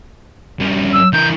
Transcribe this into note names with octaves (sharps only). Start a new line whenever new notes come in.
G2 C#4
E6
E3 A#4 G6